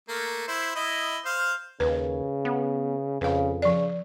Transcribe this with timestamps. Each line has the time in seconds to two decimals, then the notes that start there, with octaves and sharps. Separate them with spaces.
0.09 A3 A#3
0.48 E4 C5
0.75 E4 D#5 B5
1.25 C5 F5
1.80 D#2 C#3 B4
2.45 B3
3.21 F2 C#3 B4 F5
3.62 C#3 F3 D5